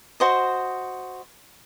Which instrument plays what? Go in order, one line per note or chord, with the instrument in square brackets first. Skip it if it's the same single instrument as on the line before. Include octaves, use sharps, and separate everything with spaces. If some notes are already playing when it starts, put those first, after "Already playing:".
[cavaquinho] F#4 C5 D#5